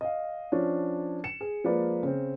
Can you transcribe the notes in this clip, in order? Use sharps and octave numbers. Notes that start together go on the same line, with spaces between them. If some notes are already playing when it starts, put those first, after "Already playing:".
D#5 F5
F3 C#4 D4
C#7 E7
G#4
F3 G#3 A#3 B4 D5
C#3 C4